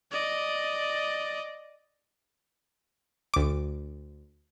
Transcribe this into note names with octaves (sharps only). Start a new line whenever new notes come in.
D5 D#5
D2 D6